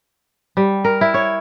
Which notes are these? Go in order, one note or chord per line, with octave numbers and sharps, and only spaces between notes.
G3
A#4
E4
C#5